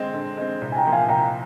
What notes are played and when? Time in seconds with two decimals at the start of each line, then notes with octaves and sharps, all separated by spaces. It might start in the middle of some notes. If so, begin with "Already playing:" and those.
Already playing: D3 G#3 C4 G5
0.13 D3
0.37 G#3 C4
0.61 C2
0.72 G#5
0.77 G5 A#5
0.85 A#2 F3
0.92 F5 G#5
1.08 C2 G5 A#5